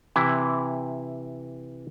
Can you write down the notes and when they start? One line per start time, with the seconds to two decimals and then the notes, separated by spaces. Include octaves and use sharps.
0.16 C3 E3 E4